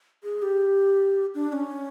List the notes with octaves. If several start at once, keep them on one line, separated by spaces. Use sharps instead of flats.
G#4
G4
D4
C#4